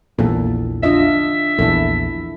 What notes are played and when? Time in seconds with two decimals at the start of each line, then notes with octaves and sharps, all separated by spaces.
0.19 A#1 E2 A#2 A4
0.83 D4 F4 D#5 E5
1.59 A#1 E2 E4 A4